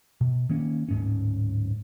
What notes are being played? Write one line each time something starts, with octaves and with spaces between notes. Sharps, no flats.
B2
D#3 A#3 C#4
D1 G#2 C#4